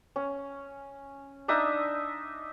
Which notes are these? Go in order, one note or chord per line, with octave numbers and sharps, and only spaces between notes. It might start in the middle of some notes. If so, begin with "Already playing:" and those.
C#4
D4 D#4 E5 D#6